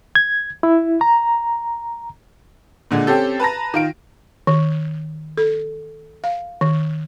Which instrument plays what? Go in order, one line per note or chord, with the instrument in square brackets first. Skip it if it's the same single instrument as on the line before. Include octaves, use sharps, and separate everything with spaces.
[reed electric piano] G#6
E4
A#5
[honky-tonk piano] A#2 D3 G#3
C4 C#4 G4 A4
B4 A5 A#5 A#6
D#3 F4 D7
[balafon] D#3
A4
F5
D#3